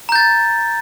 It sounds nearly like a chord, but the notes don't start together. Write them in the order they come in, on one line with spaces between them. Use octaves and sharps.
A#5 G6 A6